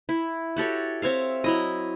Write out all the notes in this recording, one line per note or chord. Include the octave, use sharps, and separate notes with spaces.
E4
F#4 G4 A4 C#5
C4 C#5 E5 F5
F#3 E4 D#5